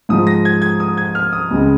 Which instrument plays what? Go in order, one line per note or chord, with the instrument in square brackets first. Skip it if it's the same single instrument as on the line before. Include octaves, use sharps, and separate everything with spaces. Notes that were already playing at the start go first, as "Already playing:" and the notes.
[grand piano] G#2 F3 G#3 D#6
A#6
G#6
G#6
D#6
G#6
F6
D#6
C#2 C#3 G#3